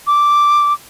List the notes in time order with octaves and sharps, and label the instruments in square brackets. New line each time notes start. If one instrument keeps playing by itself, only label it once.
[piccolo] D6